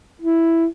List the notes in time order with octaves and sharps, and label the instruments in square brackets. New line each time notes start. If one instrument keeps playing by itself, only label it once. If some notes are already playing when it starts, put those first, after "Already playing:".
[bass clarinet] E4